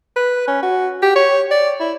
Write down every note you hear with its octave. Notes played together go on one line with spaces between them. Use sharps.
B4
C#4
F#4
G4
C#5
D5
E4